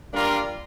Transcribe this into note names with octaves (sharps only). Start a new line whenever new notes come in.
G3 A#3 D4 F4 A#4